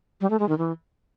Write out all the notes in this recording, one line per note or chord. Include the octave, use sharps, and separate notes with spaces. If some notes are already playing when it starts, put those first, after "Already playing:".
G3
A3
G#3
D#3
E3